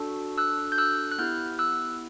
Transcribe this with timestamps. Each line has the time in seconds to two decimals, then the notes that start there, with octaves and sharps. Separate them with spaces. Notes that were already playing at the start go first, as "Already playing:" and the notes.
Already playing: D4 F#4 A4
0.38 E6 F#6
0.72 G6
0.78 E6 F#6
1.12 F#6
1.18 B3 E4 G4 F6 G6
1.59 E6 F#6